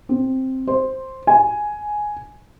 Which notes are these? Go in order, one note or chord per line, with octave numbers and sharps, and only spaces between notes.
C4
C5
G#5